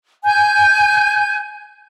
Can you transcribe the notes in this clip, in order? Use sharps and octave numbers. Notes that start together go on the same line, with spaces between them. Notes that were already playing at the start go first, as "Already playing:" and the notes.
G#5 G6